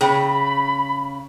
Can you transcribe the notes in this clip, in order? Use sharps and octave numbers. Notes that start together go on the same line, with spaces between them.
C#3 G#4 G5 B5